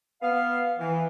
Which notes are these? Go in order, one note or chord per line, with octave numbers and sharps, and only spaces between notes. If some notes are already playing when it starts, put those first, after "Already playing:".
B3 F5
E3